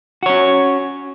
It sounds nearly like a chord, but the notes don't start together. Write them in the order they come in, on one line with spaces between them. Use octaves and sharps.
F#4 C#5 C#4